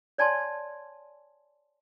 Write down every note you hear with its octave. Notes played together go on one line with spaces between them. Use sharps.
C#5 D5 G#5 A5 C6